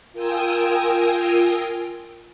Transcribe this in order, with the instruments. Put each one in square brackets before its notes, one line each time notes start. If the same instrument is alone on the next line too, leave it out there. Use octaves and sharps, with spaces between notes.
[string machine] F4 A#4 G5 G#5 D#6 E6